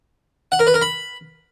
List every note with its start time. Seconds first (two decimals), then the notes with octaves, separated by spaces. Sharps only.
0.52 F#5
0.59 A#4
0.67 B4
0.74 A#4
0.82 B5